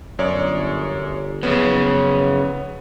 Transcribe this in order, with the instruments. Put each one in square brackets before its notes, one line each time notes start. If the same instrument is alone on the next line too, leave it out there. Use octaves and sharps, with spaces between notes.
[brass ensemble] G1 [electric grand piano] F#2 C#5 D5
[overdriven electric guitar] F#2 C#3 [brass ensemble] F3 B4 C#5 [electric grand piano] B3